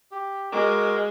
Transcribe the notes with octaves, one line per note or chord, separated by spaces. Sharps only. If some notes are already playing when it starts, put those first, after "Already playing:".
G4
G#3 F#4 A#4 D6